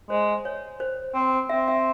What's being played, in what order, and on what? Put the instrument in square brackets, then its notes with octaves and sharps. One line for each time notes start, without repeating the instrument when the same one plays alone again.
[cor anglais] G#3 [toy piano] C5
[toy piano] C#5
C5
[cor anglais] C4
[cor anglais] C4 [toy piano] E5
[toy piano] E5